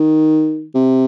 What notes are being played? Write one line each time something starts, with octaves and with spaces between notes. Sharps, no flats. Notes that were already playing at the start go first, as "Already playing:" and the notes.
Already playing: D#3
C3